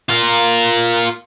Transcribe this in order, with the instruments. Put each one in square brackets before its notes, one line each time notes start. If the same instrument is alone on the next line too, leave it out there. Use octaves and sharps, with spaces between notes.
[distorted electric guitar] F4 A#4